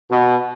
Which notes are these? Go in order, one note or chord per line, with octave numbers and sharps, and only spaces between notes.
B2